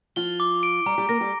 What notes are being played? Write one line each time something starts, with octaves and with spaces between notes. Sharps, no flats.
F3 F4 G7
D6
D7
G3 G4 A#5
G3 G4
A#3 A#4 A#6
G3 G4